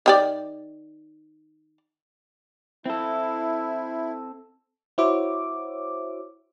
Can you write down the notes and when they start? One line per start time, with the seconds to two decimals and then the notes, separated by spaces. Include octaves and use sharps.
0.06 D#3 G4 D5
2.86 C4 E4 A4
4.98 E4 F#4 C5 C#5 E5 D6